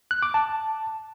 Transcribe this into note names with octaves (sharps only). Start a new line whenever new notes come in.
F#6
D6
A5